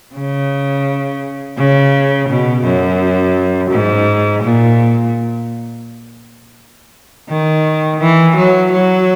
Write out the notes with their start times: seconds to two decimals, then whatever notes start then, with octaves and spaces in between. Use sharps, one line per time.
0.14 C#3
1.57 C#3
2.29 B2
2.64 F#2
3.71 G#2
4.43 A#2
7.29 D#3
8.00 E3
8.36 F#3
8.71 F#3